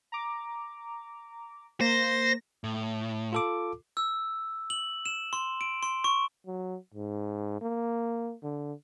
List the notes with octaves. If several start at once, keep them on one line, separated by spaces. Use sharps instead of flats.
A#5 D6
A#3 C5 A#6
A2
F4 A4 D6
E6
F#7
E7
C6
D7
C6
C#6
F#3
G#2
A#3
D3